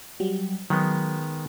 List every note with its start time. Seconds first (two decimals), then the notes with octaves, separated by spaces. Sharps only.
0.20 F#3 G3
0.70 D#3 F#3 G#3 B3